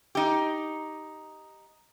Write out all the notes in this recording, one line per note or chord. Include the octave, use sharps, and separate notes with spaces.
D#4 G4